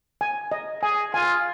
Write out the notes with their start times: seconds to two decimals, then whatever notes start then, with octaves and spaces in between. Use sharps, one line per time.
0.21 G#5
0.52 D#5
0.83 G#4 G#5
1.14 F4 G#5